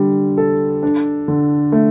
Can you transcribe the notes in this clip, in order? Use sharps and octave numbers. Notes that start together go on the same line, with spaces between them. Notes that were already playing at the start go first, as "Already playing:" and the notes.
Already playing: D3 G3
A4
D4
D3
A3